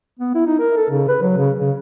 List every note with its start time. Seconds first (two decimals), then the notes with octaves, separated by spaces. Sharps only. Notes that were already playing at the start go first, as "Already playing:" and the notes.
0.19 B3
0.35 E4
0.47 D#4
0.60 A#4
0.77 A4
0.90 C#3
1.08 B4
1.22 F#3
1.37 C#3
1.59 C#3